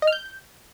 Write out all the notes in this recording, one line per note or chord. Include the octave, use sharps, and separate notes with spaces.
D#5
F6
G6